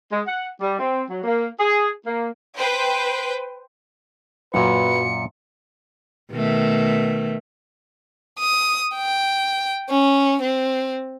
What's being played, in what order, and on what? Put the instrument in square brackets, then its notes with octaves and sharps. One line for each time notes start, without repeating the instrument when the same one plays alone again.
[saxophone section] G#3
F#5
G3
C4
F#3
A#3
G#4
A#3
[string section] B4 C5 G5
[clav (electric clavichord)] F#2 A#2 [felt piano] F#3 [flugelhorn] B4 [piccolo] C#7
[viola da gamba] B2 D#3 A3
[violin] D#6
G5
C#4
C4